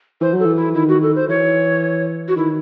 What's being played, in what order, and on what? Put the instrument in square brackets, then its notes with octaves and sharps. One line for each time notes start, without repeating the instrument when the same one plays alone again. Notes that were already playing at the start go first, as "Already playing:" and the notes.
[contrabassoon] E3 [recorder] C5
[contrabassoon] F#3
[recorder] A4
[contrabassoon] E3
[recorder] E4
[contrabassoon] D#3 [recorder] E4
[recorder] F#4
A4
C5
[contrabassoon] E3 [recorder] C#5
[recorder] F#4
[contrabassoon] D#3 [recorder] E4